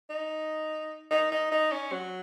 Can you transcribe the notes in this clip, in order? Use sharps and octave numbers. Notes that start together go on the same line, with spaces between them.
D#4
D#4
D#4
D#4
C#4
F#3